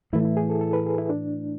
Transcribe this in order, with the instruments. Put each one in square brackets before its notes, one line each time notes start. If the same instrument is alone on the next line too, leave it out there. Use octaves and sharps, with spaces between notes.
[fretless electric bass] A2 E3 A3 [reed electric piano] E4
[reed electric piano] E4
G#4
A4
A4
B4
G#4
E4
D4